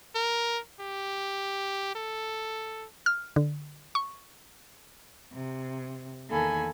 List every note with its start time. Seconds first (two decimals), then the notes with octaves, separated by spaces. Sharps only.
0.15 A#4
0.81 G4
1.96 A4
3.06 F6
3.36 D3
3.95 C#6
5.32 C3
6.28 E2 D#3 A#3 A4 G#5 B5